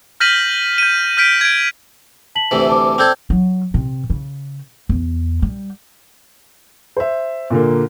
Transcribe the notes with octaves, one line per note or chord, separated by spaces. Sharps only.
F6 G6 A#6 B6 D#7 F#7
G6 D#7
F6 G6 B6 D7
G#6 D7
A5 B6 F#7
D2 C3 E3
A5 D6
C4 D4 A4 G5 G6 G#6
F#3
C3
C#3
E2
G3
C5 E5
A#2 D3 A#3